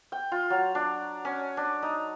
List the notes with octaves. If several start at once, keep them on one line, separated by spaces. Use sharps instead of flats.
G5
F4
F#3
D4
C#4
D4
D#4